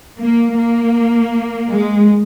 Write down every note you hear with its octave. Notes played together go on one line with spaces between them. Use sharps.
A#3
A#3
G#3